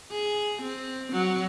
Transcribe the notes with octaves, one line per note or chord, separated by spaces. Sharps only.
G#4
C4
F#3